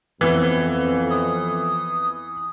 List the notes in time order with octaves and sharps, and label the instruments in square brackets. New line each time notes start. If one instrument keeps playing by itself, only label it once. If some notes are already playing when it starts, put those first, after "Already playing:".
[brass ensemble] F2 [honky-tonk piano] E3 [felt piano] B3
[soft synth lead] D#6